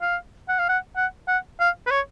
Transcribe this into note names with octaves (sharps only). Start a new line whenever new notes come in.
F5
F#5
F5
F#5
F#5
F#5
F5
B4
C#5